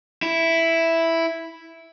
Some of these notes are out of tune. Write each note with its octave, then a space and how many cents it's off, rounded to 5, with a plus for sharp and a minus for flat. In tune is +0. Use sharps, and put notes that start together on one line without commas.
E4 +0